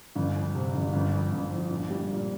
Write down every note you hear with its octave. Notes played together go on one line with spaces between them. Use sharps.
G1
F2
C3
G1
G1
F2
G1
F3
A#1
G3
A#2